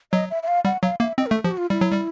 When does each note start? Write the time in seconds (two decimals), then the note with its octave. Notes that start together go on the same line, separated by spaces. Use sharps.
0.12 F#3 D#5
0.30 E5
0.43 E5
0.48 F5
0.65 G3 F#5
0.83 F#3 F5
1.00 A#3 E5
1.18 C4 D#5
1.26 A#4
1.31 A3 A4
1.44 F3 G4
1.51 F#4
1.57 F4
1.70 G3 E4
1.81 F#3
1.92 G3